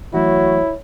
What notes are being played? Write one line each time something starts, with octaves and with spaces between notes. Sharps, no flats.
E3 F#3 A3 E4 F#4 C#5